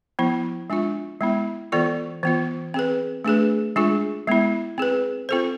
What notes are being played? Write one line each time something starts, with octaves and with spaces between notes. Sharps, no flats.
F3 B3 E4
G#3 D4 F4
G#3 B3 E4
E3 B3 F4 A4 D5
E3 B3 F4
C4 G#4 B4
A3 D4 G#4 B4
G#3 D4 F4 G#4
G#3 B3 E4
C4 G#4 B4
C4 F4 A4 C5